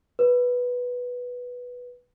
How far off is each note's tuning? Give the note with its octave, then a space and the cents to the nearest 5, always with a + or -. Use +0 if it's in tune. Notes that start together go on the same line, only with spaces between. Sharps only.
B4 -5